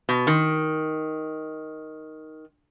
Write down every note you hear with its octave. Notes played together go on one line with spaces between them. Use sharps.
B2
D#3